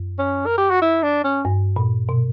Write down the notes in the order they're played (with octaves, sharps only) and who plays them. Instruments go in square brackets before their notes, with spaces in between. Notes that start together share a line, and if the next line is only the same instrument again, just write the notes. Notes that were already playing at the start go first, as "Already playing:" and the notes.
Already playing: [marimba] F#2
[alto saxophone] C#4
A#4
G4
F#4
E4
D4
C#4
[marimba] G2
A#2
B2